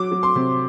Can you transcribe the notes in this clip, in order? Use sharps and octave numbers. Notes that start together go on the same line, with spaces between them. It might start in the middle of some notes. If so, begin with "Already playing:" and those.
Already playing: F#3 D6
F#3
C6
C3